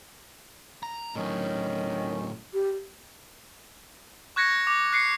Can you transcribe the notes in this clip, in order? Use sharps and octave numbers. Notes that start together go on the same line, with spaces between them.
A#5
A2 D#3 F#3 C#4
G4
C#6 F#6 G#6 A#6 C#7
D6
F#6 C7 C#7